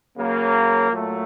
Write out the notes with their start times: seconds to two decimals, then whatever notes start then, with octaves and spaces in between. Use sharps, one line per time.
0.17 C#3 F#3 A#3
0.91 A#2 F#3 A3